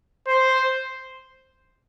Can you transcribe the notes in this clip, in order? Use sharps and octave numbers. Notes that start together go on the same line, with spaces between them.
C5